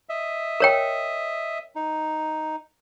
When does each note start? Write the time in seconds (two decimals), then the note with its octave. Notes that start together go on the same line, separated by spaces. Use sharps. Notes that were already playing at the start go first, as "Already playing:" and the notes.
0.09 D#5 E5
0.60 A#4 C#5 G5
1.75 D#4